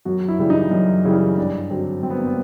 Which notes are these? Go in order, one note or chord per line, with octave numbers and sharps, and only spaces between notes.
F#2 F#4
E4
C#3 E3 G3
D#4
F#2
C#3 E3 G3
G2 D4
D3 F#3 C4
G2 C4
B3
A#3
B3